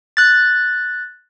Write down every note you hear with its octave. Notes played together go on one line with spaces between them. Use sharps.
F#6 A6